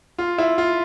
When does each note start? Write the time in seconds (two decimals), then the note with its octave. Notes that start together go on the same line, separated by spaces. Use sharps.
0.18 F4
0.38 E4
0.58 F4